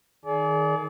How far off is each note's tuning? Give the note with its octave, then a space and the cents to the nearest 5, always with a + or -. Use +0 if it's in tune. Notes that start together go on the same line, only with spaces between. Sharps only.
D#3 +0 G#4 +25 D5 -30